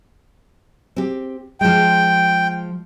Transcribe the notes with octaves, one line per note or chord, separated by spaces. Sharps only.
C4 G4
F3 G#3 G5